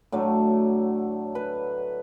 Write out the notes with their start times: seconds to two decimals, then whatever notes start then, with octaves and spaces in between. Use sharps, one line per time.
0.12 A2 D3 F#3 A3
1.35 B4